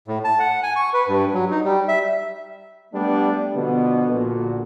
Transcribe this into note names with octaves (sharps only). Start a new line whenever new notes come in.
A2
A5
F#5
G#5
C#6
B4
G2
F#3
D#4
G3
E5
G3 A3 B3 D4 G4
B2 D3 F3 B3
A#1 A#2 D3 F#4